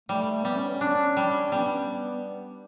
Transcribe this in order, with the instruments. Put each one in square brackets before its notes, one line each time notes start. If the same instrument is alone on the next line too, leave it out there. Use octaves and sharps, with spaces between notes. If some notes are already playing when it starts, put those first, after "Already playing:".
[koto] G3 [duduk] A3
[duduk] A3
[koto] G3 [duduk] B3
[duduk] C#4
[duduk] C#4 [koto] D4
[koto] G3
[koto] G3 [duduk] B3